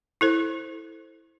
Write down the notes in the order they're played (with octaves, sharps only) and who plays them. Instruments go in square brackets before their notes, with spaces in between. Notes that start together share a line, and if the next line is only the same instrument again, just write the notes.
[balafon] E4 A4 C5